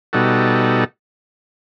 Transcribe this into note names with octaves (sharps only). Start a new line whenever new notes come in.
B2 G3 D#4 F#4 A4